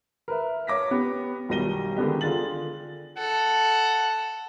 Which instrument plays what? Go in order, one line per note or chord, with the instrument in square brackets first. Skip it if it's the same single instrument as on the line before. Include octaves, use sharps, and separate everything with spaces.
[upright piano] A#4 B4 E5
C#5 D6 A#6 B6
B3 G4
B1 D#3 G3 A#6 D#7 G7
D3 D#3 G#3 B3 D4 G4
D3 F4 G#4 A6 F#7
[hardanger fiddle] A4 [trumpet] F#5